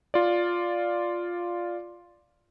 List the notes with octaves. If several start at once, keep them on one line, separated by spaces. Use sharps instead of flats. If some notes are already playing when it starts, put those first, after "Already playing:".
F4 D5